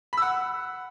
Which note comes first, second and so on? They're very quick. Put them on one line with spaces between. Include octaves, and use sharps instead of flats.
B5 E6 F#5